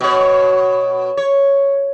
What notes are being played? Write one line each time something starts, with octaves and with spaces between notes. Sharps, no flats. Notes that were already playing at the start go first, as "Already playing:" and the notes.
B2 C#5
C#5